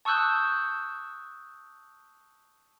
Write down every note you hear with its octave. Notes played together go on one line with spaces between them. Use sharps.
A5 C#6 D#6 E6 F#6 G6